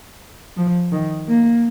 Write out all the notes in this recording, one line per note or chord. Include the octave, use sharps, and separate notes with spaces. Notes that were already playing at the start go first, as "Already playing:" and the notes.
F3
D#3
A#3